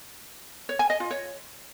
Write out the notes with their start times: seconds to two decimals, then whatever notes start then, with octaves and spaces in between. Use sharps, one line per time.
0.69 C#5
0.79 G#5
0.90 D#5
1.00 F4
1.10 C#5